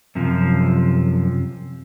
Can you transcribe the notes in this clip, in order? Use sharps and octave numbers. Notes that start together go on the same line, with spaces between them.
F#2 C3 F3